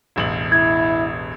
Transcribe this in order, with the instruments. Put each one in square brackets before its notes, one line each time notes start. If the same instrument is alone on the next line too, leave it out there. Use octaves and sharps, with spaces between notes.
[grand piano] E1 A1 F#7
[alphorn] E4 [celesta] G#6